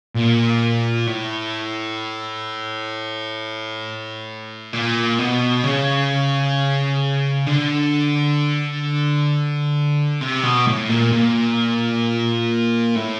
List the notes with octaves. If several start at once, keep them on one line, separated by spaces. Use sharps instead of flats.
A#2
A2
A#2
B2
C#3
D3
C3
B2
A2
A#2
A#2
A2